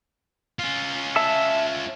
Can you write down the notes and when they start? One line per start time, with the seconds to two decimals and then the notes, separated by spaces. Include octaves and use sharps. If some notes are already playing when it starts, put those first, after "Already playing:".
0.59 C#4 F4
1.16 E5 A5 E6